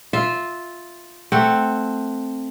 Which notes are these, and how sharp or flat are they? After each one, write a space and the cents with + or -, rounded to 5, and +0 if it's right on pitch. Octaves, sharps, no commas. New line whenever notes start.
F4 +0 E5 -10
A3 +0 C4 +0 F#5 +0